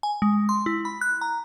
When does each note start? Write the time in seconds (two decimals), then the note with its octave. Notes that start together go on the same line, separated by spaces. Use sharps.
0.03 G#5
0.22 G#3
0.49 C6
0.66 E4
0.85 B5
1.01 F#6
1.21 A#5